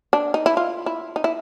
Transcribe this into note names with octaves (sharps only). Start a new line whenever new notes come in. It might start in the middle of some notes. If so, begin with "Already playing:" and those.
D4
D#4
E4
F4
E4
D#4
E4